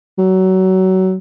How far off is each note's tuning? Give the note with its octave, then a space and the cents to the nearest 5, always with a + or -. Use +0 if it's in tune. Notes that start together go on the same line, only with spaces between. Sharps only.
F#3 +25